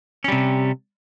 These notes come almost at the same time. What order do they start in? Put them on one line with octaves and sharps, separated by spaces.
C#4 G3 C3